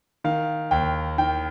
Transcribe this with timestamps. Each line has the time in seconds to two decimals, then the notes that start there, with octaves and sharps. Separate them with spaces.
0.24 D#3 F5
0.71 D#2 G5
1.18 D#3 G5